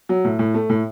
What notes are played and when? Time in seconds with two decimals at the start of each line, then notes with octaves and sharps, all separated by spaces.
0.09 F#3
0.25 A2
0.39 A2
0.54 A3
0.70 A2